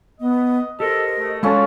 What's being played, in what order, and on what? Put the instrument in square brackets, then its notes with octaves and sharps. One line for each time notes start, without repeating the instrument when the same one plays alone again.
[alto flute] B3 [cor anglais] D#5
[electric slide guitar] G4 A#4 C5 [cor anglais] A4 [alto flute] D#5
[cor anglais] A3
[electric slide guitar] G#3 F#4 [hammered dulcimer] C#4 F4 A4